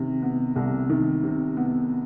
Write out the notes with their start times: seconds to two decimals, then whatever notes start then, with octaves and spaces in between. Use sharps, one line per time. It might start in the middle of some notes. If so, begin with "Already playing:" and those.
Already playing: C3 D#3
0.22 B3
0.56 C2
0.89 D#3
1.23 C3
1.57 B3